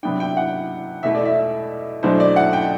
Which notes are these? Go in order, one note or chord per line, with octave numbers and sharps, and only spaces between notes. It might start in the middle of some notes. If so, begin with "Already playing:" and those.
C3 F#3 B3 D4 G5
G5
F#5
E2 B2 A3 E4 E5
D5
E5
E2 B2 F#3 A3 D4 C5
D5
F#5
G5